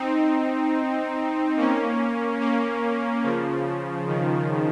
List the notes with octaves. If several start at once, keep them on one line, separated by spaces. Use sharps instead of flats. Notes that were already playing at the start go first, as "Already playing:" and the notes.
Already playing: C4 D#4
A#3 C#4
A#3 C#4
C#3 F3
D#3